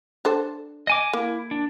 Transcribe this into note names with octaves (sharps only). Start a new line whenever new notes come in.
D4 A4 C5
D#5 G#5 D6
A#3 E4
D4